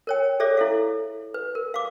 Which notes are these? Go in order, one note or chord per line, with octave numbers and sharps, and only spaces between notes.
A#4 C#5 G5
G#4 A4 C#5 D5 E5
E4 A4 F5
B4
A#4
F5 D6